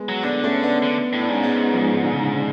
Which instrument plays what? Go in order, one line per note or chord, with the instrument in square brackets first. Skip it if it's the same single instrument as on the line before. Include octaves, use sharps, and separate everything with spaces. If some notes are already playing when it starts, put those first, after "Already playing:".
Already playing: [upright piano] G#3 B3
[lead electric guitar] F#3
[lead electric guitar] D3 [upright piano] B3 D4
[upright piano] A3 C#4
B3 D4
[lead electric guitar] D3
A2
[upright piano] D4
[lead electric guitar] G#2 [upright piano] C#4
[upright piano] G#3 B3
F3 G#3
D3
C#3
D3
D3